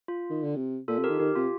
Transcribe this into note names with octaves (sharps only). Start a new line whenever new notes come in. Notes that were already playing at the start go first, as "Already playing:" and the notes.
F4
D#3
D3
C3
A#2 F4 A4
C3
G4 A#4
D#3
D#3 G4
C3 F4